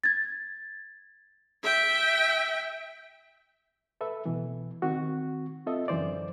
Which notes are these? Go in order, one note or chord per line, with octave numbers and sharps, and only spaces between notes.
G#6 A6
E5 G5
A4 B4 E5
B2 E3
D#3 C4 F#4 C#6
C4 F4 A4 D#5 E5
F#2 D3 E3 C5 D5